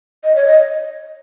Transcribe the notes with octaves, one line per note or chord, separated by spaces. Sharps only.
D#5
C#5
D#5